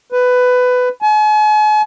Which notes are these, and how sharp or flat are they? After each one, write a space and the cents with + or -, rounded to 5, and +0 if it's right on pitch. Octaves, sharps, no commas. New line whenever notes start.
B4 +15
G#5 +45